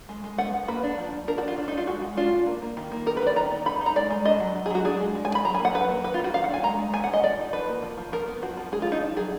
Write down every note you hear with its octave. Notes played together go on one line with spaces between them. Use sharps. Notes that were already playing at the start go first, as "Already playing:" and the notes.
G#3
G#3
B3 F#5
B3
A#3 B4
D4
F3
F3
D4 A#4
F#4
D4
F4
D4
D#4
D4
F4
G#3 F#4
G#3
D4 F4
D4
A#3
A#3
D#3
A#3
B3 A#4
B4
D#3 D5
D#3 A#5
B3
D#4 B5
D#4
A#5
G#3 D5
G#3
D4 D#5
F#3
F#3
G#4
F#3 F#4
D4 G#4
G#3
G#3
G#5
D4
B5
F#3 A#5
G#5
A#3
F#5
F#3 B4
A#3
D#3 B4
F4
D#3
F#4
D#3 F5
F#5
D4
G#5
G#3 A#5
G#3
B3 G#5
F#5
G#3
D#5
F3 D5
D#4
F3 B4
A#3
F3
F3
F3 A#4
B3
F3 F#4
F3
G#3 G#4
F4
F3 D#4
D4
F#3 G#4